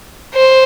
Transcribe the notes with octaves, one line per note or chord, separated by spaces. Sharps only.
C5